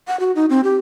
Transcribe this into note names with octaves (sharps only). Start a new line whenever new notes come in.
F#5
F#4
D#4
C4
G4